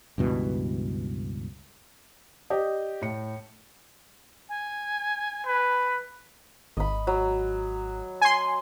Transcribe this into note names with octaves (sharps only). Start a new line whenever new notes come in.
C#2 G2 B2 E3
G4 D5 D#5
A2 C#7
G#5
B4
G#1 D#5 B5
F#3
G#5 C6